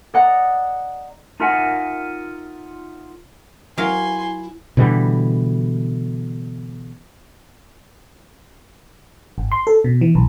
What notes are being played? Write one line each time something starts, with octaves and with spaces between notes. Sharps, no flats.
D5 D#5 F#5 A#5 D#6
D#4 F4 A#4 E5 F#5 G#5
F#3 E4 A#4 F5 G#5 C6
B2 D3 E3 G3
G#1
C6
A4
B2
E3
B1